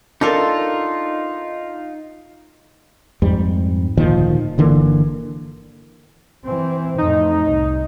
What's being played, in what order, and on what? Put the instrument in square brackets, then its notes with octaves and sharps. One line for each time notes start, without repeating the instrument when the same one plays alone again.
[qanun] D4 A4 A#4 [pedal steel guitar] D#4 F4
[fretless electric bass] F2 G#2 G3
D1 A#2 D#3 F3
G1 D3 E3 A#3
[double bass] E3 C4
[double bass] F2 A2 [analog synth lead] D#4
[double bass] C2